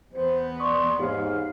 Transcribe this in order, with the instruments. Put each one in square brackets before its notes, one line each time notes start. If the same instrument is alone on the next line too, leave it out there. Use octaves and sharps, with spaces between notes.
[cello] E2 B3 [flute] C5
[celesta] D5 C#6 D#6 [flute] C6
[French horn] G#2 [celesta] G4 G#4 C#5 [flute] F5